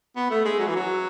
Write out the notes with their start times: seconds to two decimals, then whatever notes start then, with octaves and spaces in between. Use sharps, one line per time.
0.16 B3
0.30 A3
0.45 G#3
0.59 F#3
0.67 E3
0.75 F#3